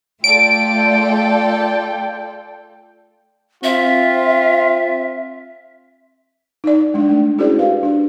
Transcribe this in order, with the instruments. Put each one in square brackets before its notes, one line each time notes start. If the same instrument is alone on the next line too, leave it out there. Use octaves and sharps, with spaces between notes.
[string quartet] A3 [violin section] F4 A4 D5 [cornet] G5 [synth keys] D7
[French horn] C4 [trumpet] F4 [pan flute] E5
[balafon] D#4 D5
G#3 D4
A3
C#4 E4 F#4 G#4 C5 D5
G4 B4 F5
D4